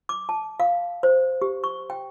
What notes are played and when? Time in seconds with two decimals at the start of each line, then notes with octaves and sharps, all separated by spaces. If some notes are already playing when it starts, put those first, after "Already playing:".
0.09 D6
0.29 A5
0.60 F5
1.03 C5
1.42 G4
1.64 C#6
1.90 G5